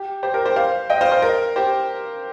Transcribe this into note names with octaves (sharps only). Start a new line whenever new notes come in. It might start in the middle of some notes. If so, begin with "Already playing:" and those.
Already playing: G4
G4 C5
A#4
G4 C5
C5 F5
D#5 G5
C5 F5
C5 F5
A#4
G4 C5